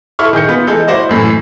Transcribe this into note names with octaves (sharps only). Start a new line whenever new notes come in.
E4 A4 C#6 F6
D#3 G#4 G6 C#7
B3 F4
E3 G#3 A4 G6
E4 F#4 C5 D5 D#5
F#2 A2 E3